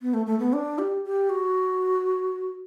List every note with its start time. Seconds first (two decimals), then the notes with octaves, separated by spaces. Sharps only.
0.02 B3
0.14 A3
0.26 A3
0.39 B3
0.53 D4
0.79 G4
1.05 G4
1.30 F#4